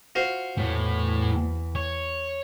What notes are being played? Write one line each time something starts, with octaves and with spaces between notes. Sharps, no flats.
F4 F#4 C5
E2 A2
C#5